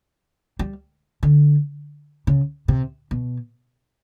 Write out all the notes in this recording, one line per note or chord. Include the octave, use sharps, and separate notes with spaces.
G3
D3
C#3
C3
B2